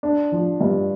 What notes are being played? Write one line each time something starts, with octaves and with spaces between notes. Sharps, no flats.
D4
F3
G2